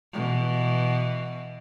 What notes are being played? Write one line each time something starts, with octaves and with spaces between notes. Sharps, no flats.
B2 E3